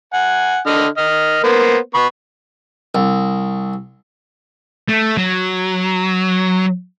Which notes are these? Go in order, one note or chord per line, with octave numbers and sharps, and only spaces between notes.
F#5 G#5
D3 D#5 F6
D#5 F6
A#3 B3 C5
B3 B5 C#6
C2
A3
F#3